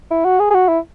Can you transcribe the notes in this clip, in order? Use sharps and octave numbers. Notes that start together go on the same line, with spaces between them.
E4
F#4
G#4
G#4
F#4
E4